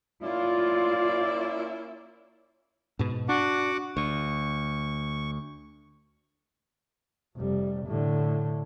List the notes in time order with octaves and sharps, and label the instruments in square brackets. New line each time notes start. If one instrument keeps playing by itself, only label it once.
[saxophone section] A#3 C#4 E4 [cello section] F4 [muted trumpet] D5
[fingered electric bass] G#2 B2
[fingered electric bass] D4 [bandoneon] F#4 F#5 D6
[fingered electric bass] D2 [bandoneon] C#6
[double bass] F1 G3
A2 D3